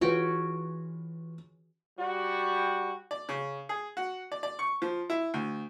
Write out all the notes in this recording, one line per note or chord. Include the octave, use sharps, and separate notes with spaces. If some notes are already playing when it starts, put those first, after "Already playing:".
E3 C#4 F4 F#4 G#4 B4 G5
G3 F#4
D5
C#3
G#4
F#4
D5
D5
C#6
F3
E4
D2